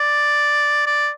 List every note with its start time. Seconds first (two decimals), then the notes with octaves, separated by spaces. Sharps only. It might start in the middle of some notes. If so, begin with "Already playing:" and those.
Already playing: D5
0.86 D5